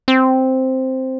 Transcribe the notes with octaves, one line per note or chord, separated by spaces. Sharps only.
C4